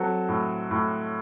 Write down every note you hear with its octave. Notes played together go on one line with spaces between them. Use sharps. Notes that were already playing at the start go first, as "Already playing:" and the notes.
Already playing: F#3 C4 A4
A2
A2